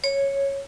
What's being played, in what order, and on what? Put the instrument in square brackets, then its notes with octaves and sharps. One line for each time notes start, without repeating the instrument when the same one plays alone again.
[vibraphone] C#5